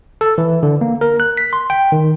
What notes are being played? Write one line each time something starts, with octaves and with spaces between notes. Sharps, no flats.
A4
E3
D3
A#3
A#4
F#6
B6
C6
G5
D#3